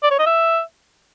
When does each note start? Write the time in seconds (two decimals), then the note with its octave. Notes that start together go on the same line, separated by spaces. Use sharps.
0.03 D5
0.11 C#5
0.19 D#5
0.26 E5